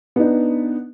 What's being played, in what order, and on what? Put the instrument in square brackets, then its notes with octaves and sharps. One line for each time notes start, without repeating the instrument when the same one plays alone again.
[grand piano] B3 D4 D#4